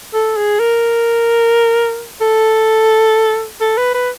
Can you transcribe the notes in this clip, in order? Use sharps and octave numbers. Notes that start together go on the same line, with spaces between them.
A4
G#4
A#4
A4
A4
B4
B4